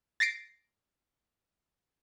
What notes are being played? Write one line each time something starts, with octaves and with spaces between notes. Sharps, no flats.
A6 A#6 C7 D7